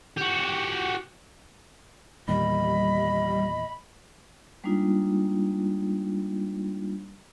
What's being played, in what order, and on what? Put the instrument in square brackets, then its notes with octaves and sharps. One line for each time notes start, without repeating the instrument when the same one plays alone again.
[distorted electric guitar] F#4 G4
[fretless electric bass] E2 A#2 D#3 [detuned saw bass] G3 [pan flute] D#5 [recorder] B5
[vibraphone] G3 G#3 A#3 D4 D#4 F4